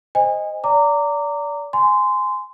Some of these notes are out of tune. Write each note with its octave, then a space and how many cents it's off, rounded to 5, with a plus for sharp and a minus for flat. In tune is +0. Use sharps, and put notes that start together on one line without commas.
C5 +0 D#5 +0 G#5 -30
D5 -30 A#5 -20 D6 -10
G#5 +5 C6 -20